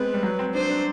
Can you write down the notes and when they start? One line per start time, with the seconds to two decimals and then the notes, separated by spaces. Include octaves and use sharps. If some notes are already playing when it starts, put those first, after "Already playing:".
Already playing: G#3 B3 C4 B4
0.14 G3
0.23 F#3
0.39 C4
0.54 D4 C5
0.70 D4